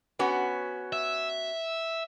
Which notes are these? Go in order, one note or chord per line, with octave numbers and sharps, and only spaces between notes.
B3 C#4 F#4
E5